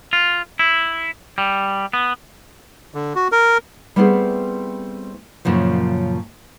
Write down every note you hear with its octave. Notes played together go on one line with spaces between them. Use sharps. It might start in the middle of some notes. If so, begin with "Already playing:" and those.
F4
E4
G3
B3
D3
F#4
A#4
G3 A3 B3 C4 E4 G#4
F#2 A#2 C#3 F3